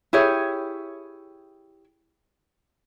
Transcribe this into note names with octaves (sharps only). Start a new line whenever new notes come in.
E4 G4 G#4 C#5